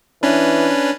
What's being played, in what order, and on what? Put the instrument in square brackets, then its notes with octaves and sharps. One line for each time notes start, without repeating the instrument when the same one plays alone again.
[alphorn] E3 [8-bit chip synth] C#4 D4 B4